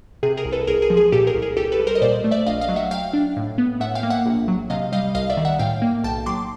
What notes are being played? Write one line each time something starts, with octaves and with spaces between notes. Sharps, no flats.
C3 G#4
G#4 A#4
C2
A4 B4
C2 G#4 A#4
G#4
F3
G#4
A#2 G4 A4
G#4 A#4
C2
G#4 A#4
C2 G4 A4
A4 B4
G3
A#4 C5
D#5
A#2 C5 D5
A3
D5 E5
A#1 D#5 F5
D#5 F5
F#3
E5 F#5
F#3 F5 G5
D4
A2
B3
A2 E5 F#5
F5 G5
A#3
E5 F#5
A#1
F#3
C3 D#5 F5
G3 D#5 F5
C2 D#5 F5
D5 E5
D#3
E5 F#5
A2 F5 G5
A#3
B1 G5 A5
F#3 C6 D6